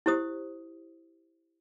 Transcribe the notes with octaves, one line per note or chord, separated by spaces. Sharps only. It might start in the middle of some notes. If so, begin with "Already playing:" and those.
E4 G4 C5 D#6